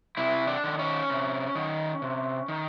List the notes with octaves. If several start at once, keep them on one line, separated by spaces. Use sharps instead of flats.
C3 E4
D4
D#3
C#4
C3
D#3
C3
D#3